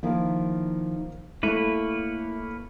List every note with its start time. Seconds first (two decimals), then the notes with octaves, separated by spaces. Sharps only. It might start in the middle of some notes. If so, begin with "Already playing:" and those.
0.03 D#3 F3 A#3 E4
1.43 A3 A#3 E4 B4 C#5